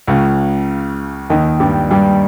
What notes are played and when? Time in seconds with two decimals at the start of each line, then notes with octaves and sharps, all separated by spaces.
0.07 C#2 C#3
1.30 D#2 D#3
1.60 G2 G3
1.91 G2 G3